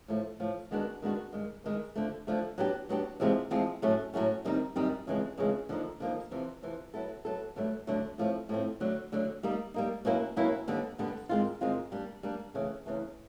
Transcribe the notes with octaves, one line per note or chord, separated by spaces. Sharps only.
A2 F3 A3
A2 F3 A3
D#3 G#3 B3 D4 F#4
D#3 G#3 B3 D4 F#4
G2 D#3 G#3
G2 D#3 G#3
D3 F3 A3
D3 F3 A3
F#3 B3 D4 G4
F#3 B3 D4 G4
E2 C3 F3 G#3 C4
E2 C3 F3 G#3 C4
A2 F#3 A3 C#4
A2 F#3 A3 C#4
F#2 D#3 G3 C4 D#4
F#2 D#3 G3 C4 D#4
F2 C#3 E3 G#3
F2 C#3 E3 G#3
D3 F3 A#3 D#4
D3 F3 A#3 D#4
F2 C3 E3
F2 C3 E3
F#3 B3 E4 A4
F#3 B3 E4 A4
G2 D3 F#3 A3
G2 D3 F#3 A3
A2 F3 A3 C4
A2 F3 A3 C4
D2 D3 F#3
D2 D3 F#3
G3 A#3 D#4
G3 A#3 D#4
B2 F#3 A#3 C#4 E4
B2 F#3 A#3 C#4 E4
D#2 D3 G3 B3
D#2 D3 G3 B3
G#2 D#3 G#3 C4 F4
G#2 D#3 G#3 C4 F4
G3 A#3 D4
G3 A#3 D4
E2 C#3 E3 A3
E2 C#3 E3 A3